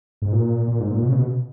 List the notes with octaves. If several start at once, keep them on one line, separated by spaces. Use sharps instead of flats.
G#2
A#2
A#2
G#2
A#2
B2
C#3
B2